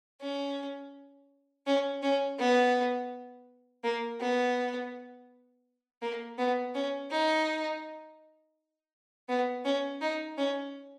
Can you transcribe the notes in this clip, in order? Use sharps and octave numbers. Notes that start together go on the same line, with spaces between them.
C#4
C#4
C#4
B3
A#3
B3
A#3
B3
C#4
D#4
B3
C#4
D#4
C#4